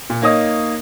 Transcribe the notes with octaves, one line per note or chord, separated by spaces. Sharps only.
A#2
A#3 D#4 C#5 D#5 D#6